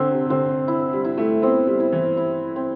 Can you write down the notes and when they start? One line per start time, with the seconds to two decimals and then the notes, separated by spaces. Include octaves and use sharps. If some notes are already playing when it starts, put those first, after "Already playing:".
Already playing: D3 C4
0.11 C3
0.26 C3
0.30 D3 C4
0.68 E4
0.93 G3
1.04 E4
1.18 A3
1.42 B3 C4
1.67 G3
1.80 E4
1.92 E3
2.17 E4
2.56 C4